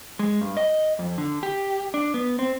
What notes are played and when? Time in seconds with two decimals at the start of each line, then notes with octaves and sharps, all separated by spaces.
0.19 G#3
0.41 G2
0.57 D#5
0.99 F2
1.18 D3
1.43 G4
1.94 D4
2.14 B3
2.39 C4